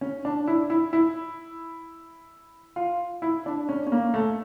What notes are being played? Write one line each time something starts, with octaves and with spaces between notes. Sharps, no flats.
C#4
D4
E4
E4
E4
F4
E4
D4
C#4
C#4
A#3
A3